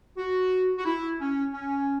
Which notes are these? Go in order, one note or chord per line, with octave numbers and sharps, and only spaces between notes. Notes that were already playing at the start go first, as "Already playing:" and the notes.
F#4
F#4
E4
C#4
C#4